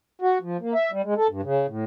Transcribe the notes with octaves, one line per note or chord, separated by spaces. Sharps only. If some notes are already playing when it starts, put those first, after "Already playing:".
F#4
F3
A#3
E5
G3
G#3
A4
G2
C#3
A2